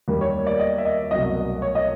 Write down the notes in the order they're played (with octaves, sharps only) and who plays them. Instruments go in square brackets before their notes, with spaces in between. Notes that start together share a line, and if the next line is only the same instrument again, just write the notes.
[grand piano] D#2 D#3 G3 A#3
C#5
D5
D#5
E5
D#5
C2 B2 F#3 A3 D#5
C#5
D#5